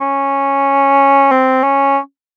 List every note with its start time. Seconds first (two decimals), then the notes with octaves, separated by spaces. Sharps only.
0.01 C#4
1.32 C4
1.64 C#4